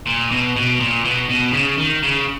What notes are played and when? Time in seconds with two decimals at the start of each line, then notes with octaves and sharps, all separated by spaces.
0.06 A#2
0.31 B2
0.56 B2
0.80 A#2
1.04 B2
1.29 B2
1.53 C#3
1.77 D#3
2.02 C#3